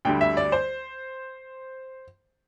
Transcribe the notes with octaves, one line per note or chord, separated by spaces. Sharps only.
D2 D3 G3 G5
E5
D5
C5